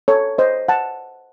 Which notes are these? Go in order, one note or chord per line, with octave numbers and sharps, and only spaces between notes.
A4 C#5
C5 D#5
F#5 A5